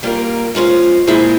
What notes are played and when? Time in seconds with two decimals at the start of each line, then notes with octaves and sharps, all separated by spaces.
0.03 G3 A#3 F4 A#4
0.55 G#3 C#4 F4 G#4 C5
1.07 A#2 G#3 E4 G#4 C5